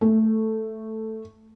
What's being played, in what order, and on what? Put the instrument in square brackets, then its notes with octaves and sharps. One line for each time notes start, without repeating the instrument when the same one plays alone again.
[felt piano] A3